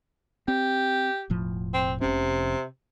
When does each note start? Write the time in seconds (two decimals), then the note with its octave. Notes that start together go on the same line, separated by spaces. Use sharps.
0.48 C4 G4
1.30 E1 A2 F3
1.74 C4
2.01 F1 C3 C#4